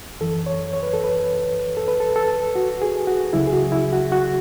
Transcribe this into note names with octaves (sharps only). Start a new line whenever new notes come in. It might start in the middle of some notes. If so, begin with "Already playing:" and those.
F#2 E3 A4
C#5
C#5
B4
A4
B4
A4
B4
A4
A4
F#4
G#4
F#4
C#2 C#3 F#3 E4
G#4
F#4
E4
F#4
F#4